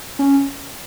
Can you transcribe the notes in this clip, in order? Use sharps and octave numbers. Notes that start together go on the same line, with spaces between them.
C#4